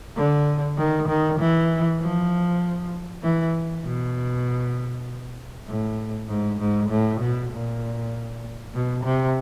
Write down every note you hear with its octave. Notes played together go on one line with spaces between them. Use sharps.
D3
D#3
D#3
E3
F3
E3
B2
A2
G#2
G#2
A2
B2
A#2
B2
C3